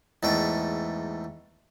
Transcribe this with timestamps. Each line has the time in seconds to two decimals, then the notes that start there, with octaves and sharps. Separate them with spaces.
0.23 E2 G#2 A3 G5